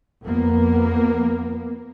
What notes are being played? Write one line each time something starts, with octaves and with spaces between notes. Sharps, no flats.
F2 A#3 B3